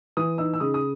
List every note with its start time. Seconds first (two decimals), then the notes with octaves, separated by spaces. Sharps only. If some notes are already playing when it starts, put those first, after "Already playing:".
0.17 E3 D#6
0.38 D#4 E6
0.54 E6
0.60 C#3 D#6
0.74 D#6